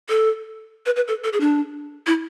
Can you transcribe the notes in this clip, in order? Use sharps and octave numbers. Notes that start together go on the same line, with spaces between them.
A4
B4
B4
A4
A4
G#4
D4
E4